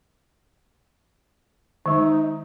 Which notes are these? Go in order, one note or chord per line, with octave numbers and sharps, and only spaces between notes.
D#3 G#3 D#4